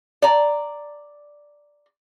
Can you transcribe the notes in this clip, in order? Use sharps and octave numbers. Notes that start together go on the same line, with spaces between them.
D5 A#5